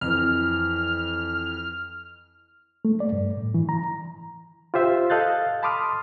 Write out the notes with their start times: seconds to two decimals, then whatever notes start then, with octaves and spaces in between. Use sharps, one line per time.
0.01 F2 E3 F6
2.85 A3
3.00 D5
3.12 G2
3.37 A2
3.54 E3
3.69 A#5
4.74 F4 G4 C5 E5
5.10 A4 D#5 F5 F#6 G6 A6
5.63 A5 B5 C6 D6 D#6 F6